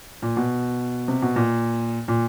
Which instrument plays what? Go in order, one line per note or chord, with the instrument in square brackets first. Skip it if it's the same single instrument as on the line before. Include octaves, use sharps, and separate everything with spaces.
[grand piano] A#2
B2
C3
B2
A#2
A#2